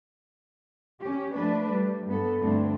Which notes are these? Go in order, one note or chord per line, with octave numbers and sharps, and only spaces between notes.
C#4 G4
F3 A3 D4 B4
G3
G2 B3 A4
D2 G2 F3 A3 C4 D4